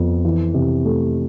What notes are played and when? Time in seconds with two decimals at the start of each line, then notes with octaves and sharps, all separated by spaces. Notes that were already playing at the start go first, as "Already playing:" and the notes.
Already playing: F2 B3 F4
0.25 E3
0.54 C3
0.85 A3